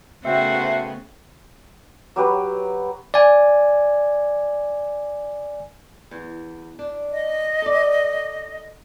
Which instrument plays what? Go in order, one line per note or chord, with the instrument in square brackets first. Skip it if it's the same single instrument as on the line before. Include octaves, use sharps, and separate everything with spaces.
[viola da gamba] C#3 B3 [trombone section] A3 [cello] F#4 C5 [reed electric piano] E5 G5
[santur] F#3 G4 B4
[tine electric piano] D5 G#5
[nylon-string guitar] E2
D4
[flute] D#5
[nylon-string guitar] A4 D5